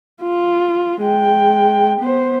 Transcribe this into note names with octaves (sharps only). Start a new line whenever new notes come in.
F4
G#3 G5
B3 C5